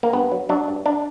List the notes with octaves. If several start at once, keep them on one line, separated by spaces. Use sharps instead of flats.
A#3
G2 B3
F#3
F#3 D4
G2
D4